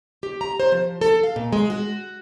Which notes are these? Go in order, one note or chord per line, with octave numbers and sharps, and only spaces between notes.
G4
A#5
C5
F3
A4
F5
A#2
G#3
F#4